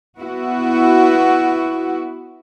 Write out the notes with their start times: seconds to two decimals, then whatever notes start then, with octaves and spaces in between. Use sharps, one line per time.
0.21 B3 E4 F#4